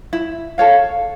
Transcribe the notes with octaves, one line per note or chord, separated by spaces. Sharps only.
E4
A4 C#5 F5